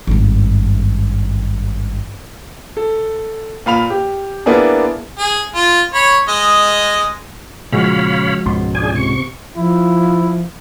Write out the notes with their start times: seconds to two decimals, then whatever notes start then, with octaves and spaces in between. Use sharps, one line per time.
0.07 G#1 G2
2.77 A4
3.66 A#2 F5 B5 F7
3.90 G4
4.46 A#3 B3 D4 E4 G#4
5.19 G#4
5.55 F4
5.94 C#5 B5
6.29 G#3 D#5
7.73 A#2 C#3 F3 G#3 F#4 C#5 F5 B5
8.46 C#2 G#2 B2 C6
8.75 C#2 D4 G#4 G#5
8.95 C3 C#6
9.56 F3 E4